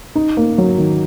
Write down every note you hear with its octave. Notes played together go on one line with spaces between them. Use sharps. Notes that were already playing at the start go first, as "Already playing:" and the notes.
D#4
A#3
F#3
D#3